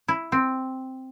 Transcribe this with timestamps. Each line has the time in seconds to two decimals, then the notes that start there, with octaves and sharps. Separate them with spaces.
0.08 E4
0.32 C4